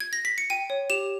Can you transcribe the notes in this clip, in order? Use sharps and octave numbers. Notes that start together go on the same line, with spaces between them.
G#6
A#6
B6
C#7
G5 D#7
C#5
G4 E7